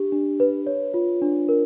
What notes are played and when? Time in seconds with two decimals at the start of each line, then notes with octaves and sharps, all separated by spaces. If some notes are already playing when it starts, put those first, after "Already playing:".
Already playing: D4 G4
0.12 D4
0.40 B4
0.67 C#5
0.94 F4
1.22 D4
1.49 A#4